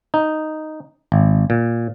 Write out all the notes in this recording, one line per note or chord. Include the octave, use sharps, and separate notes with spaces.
D#4
G#1
A#2